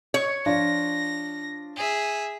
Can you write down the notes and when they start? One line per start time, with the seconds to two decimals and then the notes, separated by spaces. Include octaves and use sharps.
0.14 C#5
0.46 F3 D4 F4 A#6
1.76 G#4 E5